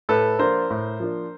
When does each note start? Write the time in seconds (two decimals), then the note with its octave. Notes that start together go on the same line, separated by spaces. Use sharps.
0.09 A2 A4 B4
0.39 F3 A#3 D4 F4 A#4 C5
0.70 A2
1.00 F3 A#3 D4 F4